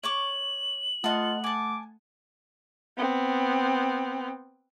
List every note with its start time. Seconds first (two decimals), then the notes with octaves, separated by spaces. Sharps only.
0.03 C#5 C#6 D6 F#7
1.04 A3 F4 A4 D#5 F#5
1.44 G#5 A5 D6
2.98 B3 C4